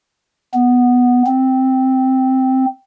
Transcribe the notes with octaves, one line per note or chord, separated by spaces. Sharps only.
B3
C4